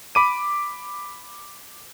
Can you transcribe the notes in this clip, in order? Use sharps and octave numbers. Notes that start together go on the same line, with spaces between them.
B5 D6 D#7